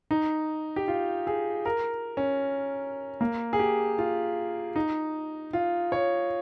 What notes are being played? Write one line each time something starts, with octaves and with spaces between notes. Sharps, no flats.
D#4
G4
F4
G#4
A#4
C#4
A#3
G#4
G4
F4
D#4
F4
C#5